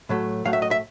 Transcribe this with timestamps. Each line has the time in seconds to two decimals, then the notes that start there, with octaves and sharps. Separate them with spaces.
0.09 A2 F#3 A3
0.45 A2 F#3 A3 F5
0.53 E5
0.62 D#5
0.71 E5